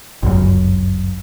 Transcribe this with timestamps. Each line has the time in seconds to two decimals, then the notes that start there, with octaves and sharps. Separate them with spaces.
0.23 G1 C#2 F#2